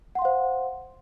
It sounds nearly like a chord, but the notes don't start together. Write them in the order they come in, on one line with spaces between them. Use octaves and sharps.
F#5 C6 F5 C5